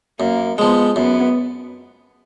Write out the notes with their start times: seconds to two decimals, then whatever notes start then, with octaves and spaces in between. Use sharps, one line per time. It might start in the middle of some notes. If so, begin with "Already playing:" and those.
0.20 F#2 A#3
0.58 F3 G#3 B3
0.96 F#2 B3